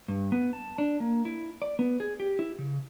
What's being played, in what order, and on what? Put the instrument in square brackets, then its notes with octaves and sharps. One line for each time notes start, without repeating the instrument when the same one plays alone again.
[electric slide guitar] G2
B3
A5
D4
A#3
E4
D5
B3
G#4
G4
E4
C#3